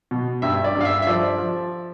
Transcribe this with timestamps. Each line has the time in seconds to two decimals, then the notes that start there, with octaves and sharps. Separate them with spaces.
0.11 B2
0.42 G2 E5
0.64 D5
0.75 G2
0.81 F5
0.85 E5
1.02 E5
1.07 F3 D5
1.39 F3